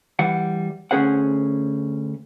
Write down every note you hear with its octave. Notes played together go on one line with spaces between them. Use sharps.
E3 G3 F#5
D2 G2 C#4 G#4 C5 F#5